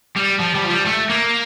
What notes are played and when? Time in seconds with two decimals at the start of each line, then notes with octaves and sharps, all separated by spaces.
0.16 G3
0.39 F3
0.55 G3
0.64 F3
0.70 G3
0.85 A3
1.09 A#3